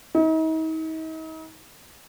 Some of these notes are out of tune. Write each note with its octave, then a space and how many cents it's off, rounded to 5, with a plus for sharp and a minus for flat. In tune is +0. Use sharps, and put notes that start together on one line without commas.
D#4 +40